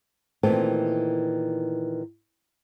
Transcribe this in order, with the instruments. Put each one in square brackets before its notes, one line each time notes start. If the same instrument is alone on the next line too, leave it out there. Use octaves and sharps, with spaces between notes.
[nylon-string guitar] A#2 D#3 E3 A3 C4